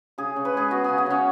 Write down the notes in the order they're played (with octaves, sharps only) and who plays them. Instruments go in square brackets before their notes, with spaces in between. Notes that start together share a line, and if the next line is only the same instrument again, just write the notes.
[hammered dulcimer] C#3 G#4
C#3
B4
G#3 G#4
B3 F#4
C#3 G#4
F#4
C#3 C#4